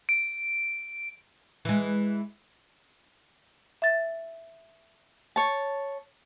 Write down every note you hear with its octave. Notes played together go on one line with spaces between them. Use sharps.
D7
E3 G#3
E5 A6
C#5 A5